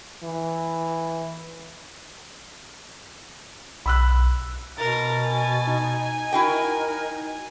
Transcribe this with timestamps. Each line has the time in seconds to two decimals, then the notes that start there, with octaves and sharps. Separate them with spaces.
0.23 E3
3.86 B1 B5 E6 F#6
4.78 B2 A#4 A6
5.25 G#5
5.67 D#4
6.33 E4 F#4 A#4 G5